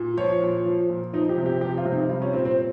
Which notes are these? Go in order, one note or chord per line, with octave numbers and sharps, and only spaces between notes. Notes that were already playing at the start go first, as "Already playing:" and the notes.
Already playing: A#2
F3 C#5
A#2
F3
A#2
F3 D#4
G4
C3
G4
F3 G4
F4
C3
D#4
G3 F4
C#4
A#2 C4
C4